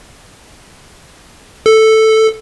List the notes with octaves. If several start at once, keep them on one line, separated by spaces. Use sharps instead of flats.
A4